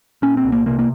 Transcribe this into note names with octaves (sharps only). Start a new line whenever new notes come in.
A#2 C#4
C4
C2
A#3
C3 A#3
A#3